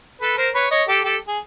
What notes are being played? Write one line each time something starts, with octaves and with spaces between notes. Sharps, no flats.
A4 B4
A#4 C5
B4 C#5
C#5 D#5
G4 A4
G4 A4
G#4